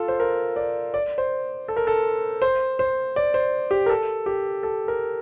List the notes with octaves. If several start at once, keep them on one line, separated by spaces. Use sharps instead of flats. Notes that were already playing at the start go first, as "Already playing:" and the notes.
Already playing: F4 A4
C5
A#4
D5
D5
C5
A4
A#4
A4
C5
C5
D5
C5
G4
A#4
A4
G4
A4
A#4